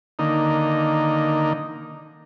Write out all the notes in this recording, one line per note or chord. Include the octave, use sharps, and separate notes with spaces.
D3 D#3 A#3 D#4